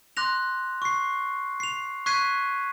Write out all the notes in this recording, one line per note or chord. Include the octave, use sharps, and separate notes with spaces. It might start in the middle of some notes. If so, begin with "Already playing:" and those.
C6 D6 F#6 A#6 F7
C#6 C7
C7 F7
C#6 F#6 G#6 B6 C7 D#7